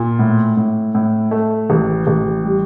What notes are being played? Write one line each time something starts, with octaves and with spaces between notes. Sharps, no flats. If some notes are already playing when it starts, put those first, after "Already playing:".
Already playing: A#2
A2
A2
A2
A3
A1
A1
G3